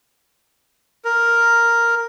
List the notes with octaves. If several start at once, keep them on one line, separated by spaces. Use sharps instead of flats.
A#4